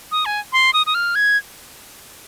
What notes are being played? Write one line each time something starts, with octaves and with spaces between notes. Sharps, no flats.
D#6
G#5
C6
D#6
D#6
F6
G#6